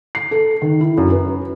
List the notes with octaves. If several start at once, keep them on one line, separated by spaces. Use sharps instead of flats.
C7
A4
D#3
E4
F#2
B4